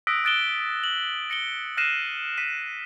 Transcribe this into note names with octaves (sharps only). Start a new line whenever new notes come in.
D#6 E6 F#6 A#6 B6 D7
D#6 F#6 A6 D7 E7 G7
F#7
A#6 C#7 D7 G7
F6 F#6 A#6 C7 D#7 E7
F6 B6 D#7